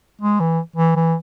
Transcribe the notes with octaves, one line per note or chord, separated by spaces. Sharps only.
G#3
E3
E3
E3